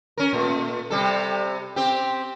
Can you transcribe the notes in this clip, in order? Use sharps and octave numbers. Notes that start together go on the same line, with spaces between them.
C#4 A#4
A#2 A3
C3 G3 A4
C4 G4